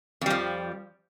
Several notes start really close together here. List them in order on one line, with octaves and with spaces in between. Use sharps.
F2 G3 F3